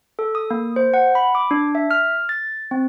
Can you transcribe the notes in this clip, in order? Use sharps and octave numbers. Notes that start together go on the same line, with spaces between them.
A4
D#6
A#3
C5
F#5
B5
D6
D4
E5
F6
A6
C4